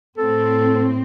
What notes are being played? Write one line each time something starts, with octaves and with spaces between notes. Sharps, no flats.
A2 C4 A4